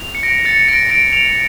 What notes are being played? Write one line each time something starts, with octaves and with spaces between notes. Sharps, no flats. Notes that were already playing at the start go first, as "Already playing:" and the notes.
Already playing: F7
C#7
A#6 D7
A6 C#7
A#6 D7
A#6 D7
D7 F7